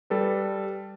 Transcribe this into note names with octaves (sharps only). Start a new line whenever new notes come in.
G3 A4 B4